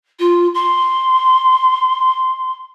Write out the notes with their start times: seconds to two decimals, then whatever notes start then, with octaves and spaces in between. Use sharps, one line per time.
0.19 F4
0.54 C6